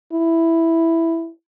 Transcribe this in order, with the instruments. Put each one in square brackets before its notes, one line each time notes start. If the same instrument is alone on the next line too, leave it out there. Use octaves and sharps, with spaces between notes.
[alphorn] E4